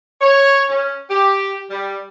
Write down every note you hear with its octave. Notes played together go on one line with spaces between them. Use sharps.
C#5
C#4
G4
G3